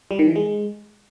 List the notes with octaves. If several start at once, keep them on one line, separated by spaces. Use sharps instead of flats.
G3
D#3
E3
G#3